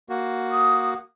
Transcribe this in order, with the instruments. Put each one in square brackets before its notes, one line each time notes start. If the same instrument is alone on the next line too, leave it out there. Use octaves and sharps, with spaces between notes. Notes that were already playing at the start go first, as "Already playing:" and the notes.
[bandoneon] A#3 F#4
[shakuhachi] D#6